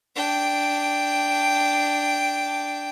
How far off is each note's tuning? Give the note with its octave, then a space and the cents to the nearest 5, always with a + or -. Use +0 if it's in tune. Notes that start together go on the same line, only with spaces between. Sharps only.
D4 -5 G5 +0